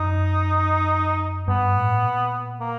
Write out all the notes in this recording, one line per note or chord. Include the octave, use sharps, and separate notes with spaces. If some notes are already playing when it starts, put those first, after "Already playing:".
Already playing: F#2 D#4
G2 B3
A2
A#2
A#3